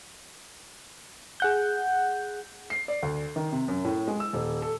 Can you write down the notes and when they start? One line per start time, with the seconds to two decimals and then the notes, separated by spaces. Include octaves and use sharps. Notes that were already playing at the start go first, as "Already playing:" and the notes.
1.40 G#4 F#5 G6
2.70 C7
2.88 D5
3.03 D2
3.36 D#3
3.52 C3
3.68 F#2
3.85 A2
4.07 G#3
4.20 E6
4.33 D#1
4.62 A4